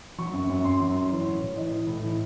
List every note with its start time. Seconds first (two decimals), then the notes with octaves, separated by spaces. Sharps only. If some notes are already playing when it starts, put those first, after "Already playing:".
0.18 F#3 C#6
0.33 F#2
0.49 F#2
0.64 F#2 C6
0.80 F#3
0.87 C6
0.95 F#3
1.10 E3 C#5
1.26 A2
1.41 A2
1.56 E3 D#5
1.72 E3
1.87 A2
2.03 E3